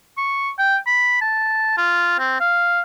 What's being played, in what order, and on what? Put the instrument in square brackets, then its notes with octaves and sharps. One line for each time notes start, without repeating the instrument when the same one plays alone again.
[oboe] C#6
G5
B5
A5
F4
C4
F5